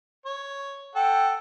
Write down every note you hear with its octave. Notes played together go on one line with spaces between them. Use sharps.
C#5
A4 F#5 G5